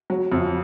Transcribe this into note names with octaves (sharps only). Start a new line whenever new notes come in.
F#3
F2